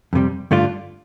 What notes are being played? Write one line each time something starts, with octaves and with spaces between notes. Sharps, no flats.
F2 C3 G3
G2 D3 A3 D4 F4